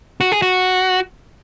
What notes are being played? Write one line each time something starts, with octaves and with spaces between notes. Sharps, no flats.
F#4
G#4
F#4